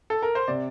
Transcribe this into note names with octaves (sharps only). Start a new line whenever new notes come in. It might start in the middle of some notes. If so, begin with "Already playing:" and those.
A4
A#4
C5
C3 D5